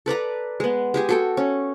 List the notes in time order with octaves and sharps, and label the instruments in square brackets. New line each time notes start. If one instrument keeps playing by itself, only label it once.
[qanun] A4 B4 D5 A#5
G#3 B3
G#3 G4 G#4
F#4 A4 G5
C#4